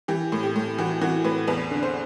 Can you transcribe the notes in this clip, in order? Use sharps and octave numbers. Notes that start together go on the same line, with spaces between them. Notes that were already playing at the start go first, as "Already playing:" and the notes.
E3 G4
A2
G4
A2
E3 F#4
E3 F#4
A2 B4
E2 B4
D3
C5